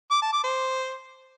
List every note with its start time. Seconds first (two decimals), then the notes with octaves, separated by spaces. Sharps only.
0.11 D6
0.22 A5
0.33 D6
0.44 C5